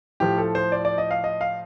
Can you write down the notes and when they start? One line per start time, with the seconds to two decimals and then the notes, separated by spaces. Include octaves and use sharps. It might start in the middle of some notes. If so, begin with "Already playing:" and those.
0.20 A2 F3 G4
0.38 A4
0.55 C5
0.72 D5
0.85 D5
0.98 D#5
1.11 F5
1.24 D#5
1.41 F5